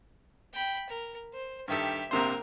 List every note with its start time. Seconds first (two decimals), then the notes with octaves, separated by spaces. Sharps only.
0.53 G5 B5
0.89 A#4
1.33 C5
1.68 G2 D#3 G4 A4 E5
2.11 A#1 C3 A#3 A#4 C5